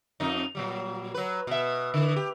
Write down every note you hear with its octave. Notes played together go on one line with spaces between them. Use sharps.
F2 D#4
A#2 F#3 G3
F#3 B4
B2 E5
D3 E3
G4